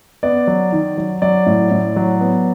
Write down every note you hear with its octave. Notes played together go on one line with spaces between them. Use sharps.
B3 D5
F#3
D#3
F#3
F#3 D5
A2
A2
F#3
B3